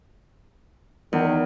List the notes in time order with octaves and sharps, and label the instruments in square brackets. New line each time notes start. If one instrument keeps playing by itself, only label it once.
[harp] E2 [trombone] D#3